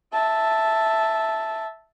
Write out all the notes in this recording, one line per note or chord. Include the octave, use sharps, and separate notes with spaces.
E5 A5